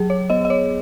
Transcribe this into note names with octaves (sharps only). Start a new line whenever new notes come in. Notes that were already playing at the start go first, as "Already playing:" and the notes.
Already playing: F#3 G#4
C#5
B3 D#5
D#5
C#5